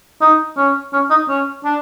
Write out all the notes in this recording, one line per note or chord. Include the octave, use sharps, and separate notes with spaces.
D#4
C#4
C#4
D#4
C#4
D4